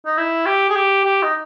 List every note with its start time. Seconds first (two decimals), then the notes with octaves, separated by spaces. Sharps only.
0.06 D#4
0.18 E4
0.46 G4
0.70 G#4
0.76 G4
1.04 G4
1.23 D#4